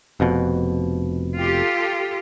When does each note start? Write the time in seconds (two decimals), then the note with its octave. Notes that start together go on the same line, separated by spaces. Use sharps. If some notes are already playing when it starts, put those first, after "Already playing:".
0.20 F1 F2 B2
1.38 F4 G4 A4